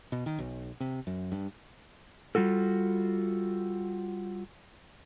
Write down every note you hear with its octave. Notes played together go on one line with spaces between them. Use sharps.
B2
D#3
B1
C3
F#2
G2
G3 F4 F#4 A4